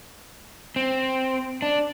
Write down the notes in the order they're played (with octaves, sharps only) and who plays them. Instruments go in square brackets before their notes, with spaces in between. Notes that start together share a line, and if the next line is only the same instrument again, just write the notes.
[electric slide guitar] C4
D4